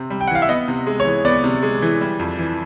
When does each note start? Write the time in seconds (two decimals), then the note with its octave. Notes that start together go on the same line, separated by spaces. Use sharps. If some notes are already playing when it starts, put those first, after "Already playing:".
Already playing: C3 C4
0.10 G3
0.21 G5
0.28 F#5
0.30 E3 F5
0.42 E5
0.49 B3 D#5
0.68 C3
0.87 G#3
1.00 C#5
1.05 E3
1.25 B3 D5
1.44 C3
1.63 G#3
1.82 E3
2.01 G3
2.19 F2
2.39 E3